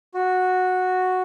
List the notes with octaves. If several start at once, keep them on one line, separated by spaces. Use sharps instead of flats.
F#4